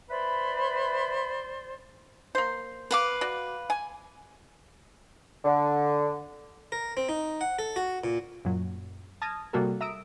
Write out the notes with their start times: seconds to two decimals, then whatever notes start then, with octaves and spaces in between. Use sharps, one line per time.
0.10 B4 C5 D5 E5 B5
2.35 A#3 C5
2.91 B4 F5 D6
3.21 F#4 D5
3.70 G#5
5.45 D3
6.72 A#4
6.97 C4
7.09 D#4
7.41 F#5
7.59 A4
7.76 F#4
8.04 A#2
8.45 F#2 A#2 F#3
9.22 A5 D#6 F6 G#6 A#6
9.53 C3 G3 A#3 F#4 A4 A#4
9.81 E5 A#5 D#6 E6 D7